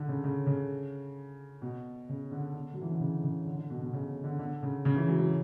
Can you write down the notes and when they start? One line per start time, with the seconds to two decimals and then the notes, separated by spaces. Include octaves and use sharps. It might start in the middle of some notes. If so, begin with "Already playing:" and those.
Already playing: D3
0.09 C#3
0.24 C#3
0.46 C#3
1.62 B2
2.09 C#3
2.31 D3
2.54 D3
2.73 F#3
2.82 E3
2.91 D3
3.00 C#3
3.24 C#3
3.46 D3
3.58 D3
3.70 B2
3.82 B2
3.93 C#3
4.24 D3
4.39 D3
4.63 C#3
4.85 C#3
4.96 E3
5.08 F#3
5.19 F#3